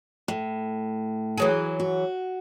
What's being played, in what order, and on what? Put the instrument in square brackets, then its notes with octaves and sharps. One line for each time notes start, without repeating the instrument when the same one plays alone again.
[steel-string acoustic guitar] A2
[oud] E3 F#3 G#4
[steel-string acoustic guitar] F#4